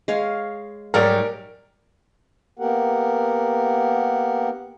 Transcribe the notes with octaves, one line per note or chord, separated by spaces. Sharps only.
G#3 C#5 F5
G#2 F#3 G3 A#4 D5
A#3 B3 G4 A#4 F#5